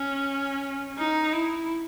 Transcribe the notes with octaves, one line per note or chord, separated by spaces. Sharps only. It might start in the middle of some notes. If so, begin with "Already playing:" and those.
Already playing: C#4
D#4
E4